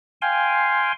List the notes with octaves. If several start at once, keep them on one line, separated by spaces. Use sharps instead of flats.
F5 G5 G#5 C6